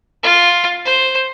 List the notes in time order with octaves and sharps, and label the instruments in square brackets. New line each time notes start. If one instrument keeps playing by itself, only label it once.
[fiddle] F4
C5